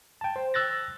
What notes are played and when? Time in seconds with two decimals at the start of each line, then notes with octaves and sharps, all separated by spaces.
0.21 G5 A5
0.36 C5
0.54 E6 F#6 A6 A#6